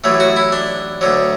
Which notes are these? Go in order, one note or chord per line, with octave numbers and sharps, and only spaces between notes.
A1 A2 F#3 A3
F#4
E4
D4
D2 D3 F#3